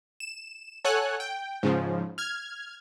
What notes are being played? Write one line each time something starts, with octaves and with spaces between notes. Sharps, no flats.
E7
A4 C#5 F#5 G#5 F#6
G5
G#2 C#3 F3
F6 G#6